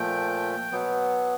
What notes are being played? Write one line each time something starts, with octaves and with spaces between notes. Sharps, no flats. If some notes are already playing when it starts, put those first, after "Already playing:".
Already playing: A#2 F3 A3 G5
B2 F#3 B3